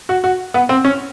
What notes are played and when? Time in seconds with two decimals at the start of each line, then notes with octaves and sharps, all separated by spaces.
0.09 F#4
0.24 F#4
0.54 B3
0.69 C4
0.85 C#4